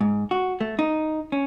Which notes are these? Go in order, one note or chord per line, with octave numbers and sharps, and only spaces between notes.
G#2
F#4
A3
D#4
C#4